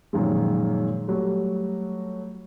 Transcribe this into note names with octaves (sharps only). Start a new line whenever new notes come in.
F#2 A#2 D#3 F3 G#3
F#3 G3 A3